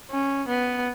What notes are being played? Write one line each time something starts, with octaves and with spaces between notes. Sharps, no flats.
C#4
B3